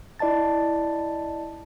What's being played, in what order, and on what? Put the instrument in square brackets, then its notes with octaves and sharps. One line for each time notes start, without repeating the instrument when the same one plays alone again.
[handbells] E4 D5 D#5 A5 A6